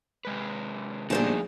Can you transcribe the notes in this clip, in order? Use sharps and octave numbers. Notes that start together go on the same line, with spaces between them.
C3 G#3 B4
G1 A#2 F3 A3 D#4 G#4 C5 A5